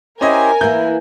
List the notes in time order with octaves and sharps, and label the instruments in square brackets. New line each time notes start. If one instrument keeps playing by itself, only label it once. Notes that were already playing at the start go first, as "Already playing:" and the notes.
[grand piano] C#4 D#5 [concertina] E4 G4 C5 [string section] A#4 G#5
[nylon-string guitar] E3 A#3 [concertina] E4 [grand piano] G6